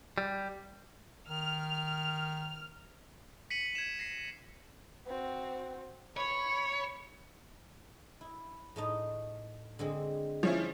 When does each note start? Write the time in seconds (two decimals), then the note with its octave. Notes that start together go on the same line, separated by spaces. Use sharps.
0.18 G3
1.28 D#3 F6
3.50 B6 C#7 D#7 F#7
3.75 G#6 E7
3.99 A#6 C7
5.07 C4 F#4
6.17 C#5 B5
8.21 E4
8.76 A2 A3 D#4
9.79 D3 G#3 C4
10.43 F3 C#4 E4